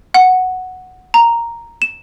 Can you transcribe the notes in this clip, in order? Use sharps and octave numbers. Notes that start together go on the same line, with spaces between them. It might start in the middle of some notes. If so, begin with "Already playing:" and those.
F#5
A#5
E7